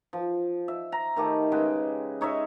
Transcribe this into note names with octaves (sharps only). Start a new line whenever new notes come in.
F3
E5
A#5
D#3 A3 G4
C#3 G#3 B4 G5
D#4 C#5 D#5 E5